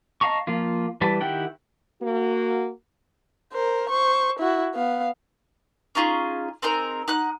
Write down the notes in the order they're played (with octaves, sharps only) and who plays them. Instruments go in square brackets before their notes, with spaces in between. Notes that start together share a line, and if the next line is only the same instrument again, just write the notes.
[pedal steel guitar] D#5 F5 A5 A#5 C#6
F3 A#3 F4
E3 G3 B4 A5
D#3 E4 G4 F#5 G5
[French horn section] A#3 F#4
[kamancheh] A#4 C5
C5 C#6
E4 F#4
B3 F5
[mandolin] C#4 D#4 F4 G#4
C4 D#4 G#4 A#4
D#4 F#5 F#6